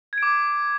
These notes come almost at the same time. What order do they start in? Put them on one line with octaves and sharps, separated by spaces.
G#6 D7 D6